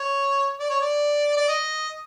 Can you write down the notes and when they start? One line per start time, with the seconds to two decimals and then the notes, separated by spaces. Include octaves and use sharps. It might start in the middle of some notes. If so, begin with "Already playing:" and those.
Already playing: C#5
0.59 D5
0.70 C#5
0.81 D5
1.37 D5
1.49 D#5